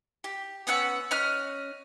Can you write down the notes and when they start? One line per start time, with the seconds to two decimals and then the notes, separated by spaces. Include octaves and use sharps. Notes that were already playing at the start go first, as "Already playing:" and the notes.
0.24 G4
0.67 B3 C#4 F#5 E6
1.11 C#4 D#5 F6 F#6